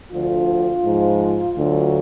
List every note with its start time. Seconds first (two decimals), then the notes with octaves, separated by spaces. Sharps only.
0.12 D2 D3 F3 F4
0.84 G#2 F3
1.57 D2 D3 F#3